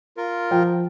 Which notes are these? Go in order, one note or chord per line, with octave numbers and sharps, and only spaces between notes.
F4 A#4
F3 G5